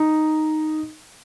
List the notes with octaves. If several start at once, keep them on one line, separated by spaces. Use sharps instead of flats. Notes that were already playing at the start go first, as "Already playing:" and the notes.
Already playing: D#4